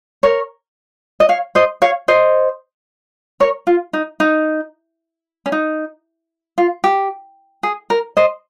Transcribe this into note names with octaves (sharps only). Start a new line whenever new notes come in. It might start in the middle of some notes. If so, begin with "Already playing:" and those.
A#4 C#5
D#5
C#5 F5
C5 D#5
C#5 F5
C5 D#5
A#4 C#5
F4
D#4
D#4
C#4
D#4
F4
G4
G#4
A#4
C5 D#5